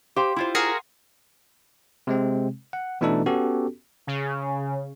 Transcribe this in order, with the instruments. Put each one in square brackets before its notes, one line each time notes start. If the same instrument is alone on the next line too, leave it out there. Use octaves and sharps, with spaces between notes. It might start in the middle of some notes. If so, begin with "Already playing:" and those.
[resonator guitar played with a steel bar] G4 C5 [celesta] F5 G5 C6
[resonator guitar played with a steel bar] E4 F4 C5
[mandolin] F#4 G#4 A#4
[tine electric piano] C3 G#3 C4
F#5
B2 E3 A3 D4 D#4 A4
B3 C#4 F#4 G4 A4
[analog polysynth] C#3